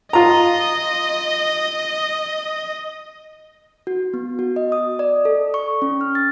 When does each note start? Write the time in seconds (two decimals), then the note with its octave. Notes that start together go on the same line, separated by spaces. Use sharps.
0.13 F4 D#5 A#5
3.87 F#4
4.14 B3
4.39 F#4
4.56 D#5
4.72 D#6
4.99 D5
5.25 A4
5.54 C#6
5.82 C#4
6.01 F6
6.15 A6